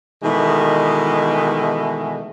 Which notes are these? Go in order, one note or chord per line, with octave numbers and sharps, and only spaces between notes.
B2 D#3 E3 G#3 A3